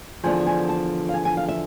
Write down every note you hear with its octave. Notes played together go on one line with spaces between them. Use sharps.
E2 D3 F3 G#5
G#5
A5
F5
G#5
G#5
F5
E5